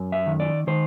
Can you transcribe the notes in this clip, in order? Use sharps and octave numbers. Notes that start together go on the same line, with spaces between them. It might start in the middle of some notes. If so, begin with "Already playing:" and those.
Already playing: F#2
E5
D#3
D5
D#3 C5